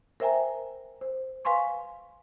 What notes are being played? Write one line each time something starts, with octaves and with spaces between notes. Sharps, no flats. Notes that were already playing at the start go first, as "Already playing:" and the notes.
A#4 C5 E5 G5 G#5 A#5
C5
B4 F5 G#5 C6 C#6